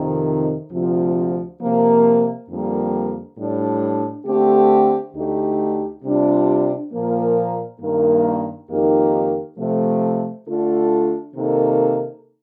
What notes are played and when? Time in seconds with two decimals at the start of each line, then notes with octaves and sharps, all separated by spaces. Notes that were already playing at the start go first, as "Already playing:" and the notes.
Already playing: F2 C3 D#3
0.72 D2 C3 F3
1.60 C3 F3 A#3
2.49 F2 D3 G3 A#3
3.37 A2 G3 D4
4.26 D3 A3 C4 G4
5.14 D2 D3 A3 D#4 G4
6.03 C3 G3 D4 F4
6.92 A#2 F3 A#3
7.80 G2 D#3 A#3
8.69 F2 D#3 A#3 D#4 G4
9.58 C3 F3 A3
10.46 D3 A3 D4 F4 A4
11.34 C3 D#3 A#3 D#4 A4